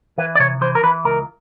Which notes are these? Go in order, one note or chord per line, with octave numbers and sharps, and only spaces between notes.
E3 B4
D5
C3 C#5
E3 C5
A#4
E3 B4
C#2 A#4